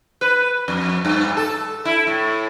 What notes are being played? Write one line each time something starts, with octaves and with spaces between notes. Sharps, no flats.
B4
F2
G2
A4
E4
A2